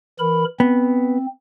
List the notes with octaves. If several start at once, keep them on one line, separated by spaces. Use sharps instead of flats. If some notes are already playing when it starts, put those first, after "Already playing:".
E3 A#4 B5
B3 C4